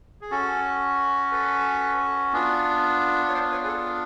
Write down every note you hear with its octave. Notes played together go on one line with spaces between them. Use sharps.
G#4
C#4 F#4 A4
A4 B4
B3 D4 F4
C#5
C5 D5
B4 C#5
G#4
A4